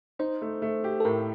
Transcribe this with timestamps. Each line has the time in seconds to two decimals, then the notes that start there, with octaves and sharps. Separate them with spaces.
0.19 D#4 C5
0.42 A3
0.62 A3
0.84 G4
1.00 A4
1.05 A2 A#4